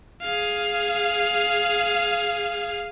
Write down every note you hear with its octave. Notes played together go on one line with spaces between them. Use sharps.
G#4 F5